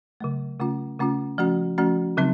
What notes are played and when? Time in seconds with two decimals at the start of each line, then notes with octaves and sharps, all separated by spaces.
0.20 C#3 F#3 A3
0.60 C#3 A3 C#4 F4
0.99 C#3 A3 C#4 F4
1.38 F3 A3 C#4 F#4
1.78 F3 A3 C#4 F#4
2.17 C#3 F#3 C4 D#4